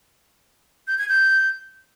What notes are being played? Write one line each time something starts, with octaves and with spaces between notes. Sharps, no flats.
G6
G#6
G6